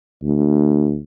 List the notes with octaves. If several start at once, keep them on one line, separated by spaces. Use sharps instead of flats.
D2